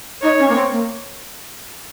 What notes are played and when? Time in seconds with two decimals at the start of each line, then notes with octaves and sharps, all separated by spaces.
0.22 D#4 C#5
0.39 C#4
0.49 A#3
0.55 C4
0.71 A#3